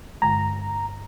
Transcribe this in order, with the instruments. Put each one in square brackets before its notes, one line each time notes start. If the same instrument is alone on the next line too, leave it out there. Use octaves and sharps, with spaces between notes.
[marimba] G2 D3 G#3 [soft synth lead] A#5